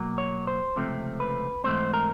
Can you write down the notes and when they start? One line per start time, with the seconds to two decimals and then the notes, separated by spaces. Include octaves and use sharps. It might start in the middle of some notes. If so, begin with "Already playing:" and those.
Already playing: B2 F#3 A#3
0.18 C#5
0.47 C5
0.76 C#2 C3 F3 A3 C4
1.20 B4
1.64 G#2 E3 A3 C4 C5
1.94 A#4